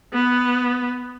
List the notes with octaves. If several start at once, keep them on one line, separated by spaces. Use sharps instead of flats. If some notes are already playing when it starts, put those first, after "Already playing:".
B3